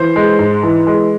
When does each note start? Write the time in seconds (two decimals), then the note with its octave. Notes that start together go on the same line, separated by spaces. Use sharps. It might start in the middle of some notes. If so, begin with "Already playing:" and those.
Already playing: E3 C5
0.16 G#3
0.39 G#2
0.63 E3
0.87 G#3